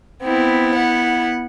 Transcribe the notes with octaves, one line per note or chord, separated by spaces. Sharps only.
B3 C4 E4
F#5